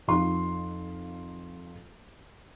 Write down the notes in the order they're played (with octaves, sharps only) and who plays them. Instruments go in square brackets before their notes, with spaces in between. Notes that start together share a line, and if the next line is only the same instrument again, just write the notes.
[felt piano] F2 D#4 F4 C6